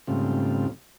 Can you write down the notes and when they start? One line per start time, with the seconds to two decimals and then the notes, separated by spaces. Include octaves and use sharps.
0.07 G#2 C#3 G3 A3 C4 F4